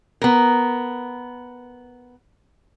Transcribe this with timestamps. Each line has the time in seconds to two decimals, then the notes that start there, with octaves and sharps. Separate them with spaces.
0.22 B3 A#4